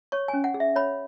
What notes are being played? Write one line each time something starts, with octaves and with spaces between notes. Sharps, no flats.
C#5 C#6
G#5
C#4
F#5
G#4
E5
C#5 B5